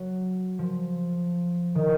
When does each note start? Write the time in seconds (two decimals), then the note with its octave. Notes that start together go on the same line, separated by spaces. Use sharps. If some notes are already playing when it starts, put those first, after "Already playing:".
Already playing: F#3
0.59 F3
1.75 D#3